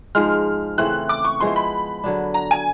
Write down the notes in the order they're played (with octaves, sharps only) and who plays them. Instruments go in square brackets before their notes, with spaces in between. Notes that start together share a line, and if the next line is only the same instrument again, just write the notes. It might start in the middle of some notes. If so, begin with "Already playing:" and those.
[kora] G#2 F3 G#3 [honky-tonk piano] F6
[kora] C#3 E3 A3 C4 [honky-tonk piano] F#6
[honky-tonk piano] D6
C#6
[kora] F3 G#3 B3 E4 [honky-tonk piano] C6
[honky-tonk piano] B5
[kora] D3 F#3 B3 D4
[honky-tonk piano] A#5
G#5